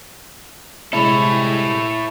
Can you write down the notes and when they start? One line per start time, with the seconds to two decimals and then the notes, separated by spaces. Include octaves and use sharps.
0.93 C3 G3 G#3 E4 A4 C#5